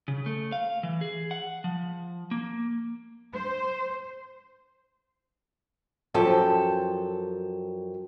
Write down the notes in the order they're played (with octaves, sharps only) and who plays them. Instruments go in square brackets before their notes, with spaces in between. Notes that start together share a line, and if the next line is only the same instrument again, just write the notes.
[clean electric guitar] C#3
A3
F5
E3
G#4
F#5
F3
A#3
[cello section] C5
[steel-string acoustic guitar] F#2 F3 A4 G5